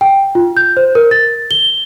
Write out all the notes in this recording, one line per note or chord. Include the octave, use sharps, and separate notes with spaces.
G5
F4
G6
C5
A#4
A6
G7